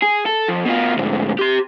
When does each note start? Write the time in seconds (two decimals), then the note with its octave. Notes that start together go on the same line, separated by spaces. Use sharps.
0.02 G#4
0.26 A4
0.49 F2
0.66 B2 F4
0.97 D2 G#2
1.39 G4 C6